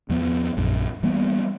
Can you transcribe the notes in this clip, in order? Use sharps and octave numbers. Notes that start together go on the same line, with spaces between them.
E2 F3 B3
A#1 F#2
E3 G3 A#3 B3